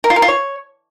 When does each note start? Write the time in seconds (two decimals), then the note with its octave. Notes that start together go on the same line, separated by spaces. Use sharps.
0.04 A#4
0.10 F4
0.16 A#4
0.22 F4
0.28 C#5